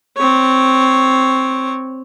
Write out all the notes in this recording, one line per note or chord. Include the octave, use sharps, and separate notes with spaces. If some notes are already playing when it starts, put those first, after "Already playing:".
C4 C#5